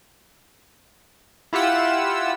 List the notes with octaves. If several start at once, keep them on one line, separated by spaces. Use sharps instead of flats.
E4 F4 G4 F#5 E6